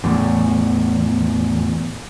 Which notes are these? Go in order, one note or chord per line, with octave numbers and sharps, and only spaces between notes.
E2 A2